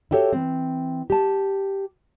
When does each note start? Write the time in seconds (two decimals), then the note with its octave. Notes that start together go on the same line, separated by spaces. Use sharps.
0.11 E4 F#4 G4 A4 C#5 E5
0.33 E3 C4
1.10 G4 A5